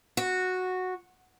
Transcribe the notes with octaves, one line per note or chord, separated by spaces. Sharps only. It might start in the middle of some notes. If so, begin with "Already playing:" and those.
F#4